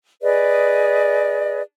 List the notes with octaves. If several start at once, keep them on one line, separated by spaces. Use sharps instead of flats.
G#4 B4 D5 D#5